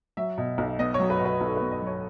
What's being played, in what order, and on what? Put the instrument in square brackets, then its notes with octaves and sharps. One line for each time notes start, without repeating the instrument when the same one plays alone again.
[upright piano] F#3 E5
B2
B1
B3 D#5
C#5
F#3
B4
B2 B4
B1 A4
B4
B3
D#5
F#3 C#5